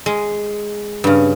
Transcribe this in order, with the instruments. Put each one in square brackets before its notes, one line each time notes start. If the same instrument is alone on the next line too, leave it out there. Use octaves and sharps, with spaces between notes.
[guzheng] G#3
G2 C#3